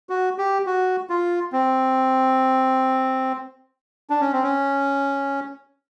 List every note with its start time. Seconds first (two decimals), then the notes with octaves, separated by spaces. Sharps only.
0.09 F#4
0.38 G4
0.66 F#4
1.10 F4
1.52 C4
4.10 D4
4.21 C#4
4.32 C4
4.43 C#4